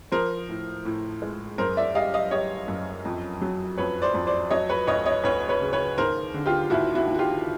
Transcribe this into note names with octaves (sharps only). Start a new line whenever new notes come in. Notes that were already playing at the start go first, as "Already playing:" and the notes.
F3 A#4 C5
A2
A2
G#3
F#2 A#4 C5
D5 E5
G3 D#5 F5
D#5 F5
G3 C#5 D#5
F#2
F2
F#3
F2 B4 C#5
C5 D5
F2
C5 D5
F#3 C#5 D#5
B4 C#5
D2 C#5 D#5
C#5 D#5
D2 B4 C#5
B4 C#5
C#3
B4 C#5
D#2 A#4 C5
D3
F4 G4
D#2 E4 F#4
E4 F#4
D#2
F#4
F4 G4